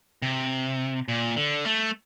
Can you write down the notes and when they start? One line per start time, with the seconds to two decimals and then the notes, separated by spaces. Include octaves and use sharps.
0.22 C3
1.08 A#2
1.37 D3
1.65 A3